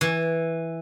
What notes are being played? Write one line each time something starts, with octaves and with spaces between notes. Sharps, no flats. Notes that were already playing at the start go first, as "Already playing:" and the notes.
E3